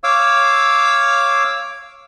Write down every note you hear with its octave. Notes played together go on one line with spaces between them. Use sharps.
C#5 F5 D6 E6